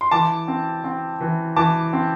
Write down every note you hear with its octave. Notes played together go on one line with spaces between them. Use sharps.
C6
E3 A5 D6
C4
C4
E3
E3 A5 D6
C4